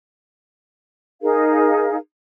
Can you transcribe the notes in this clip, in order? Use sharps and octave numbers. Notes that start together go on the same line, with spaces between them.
D#4 G#4 A#4 F5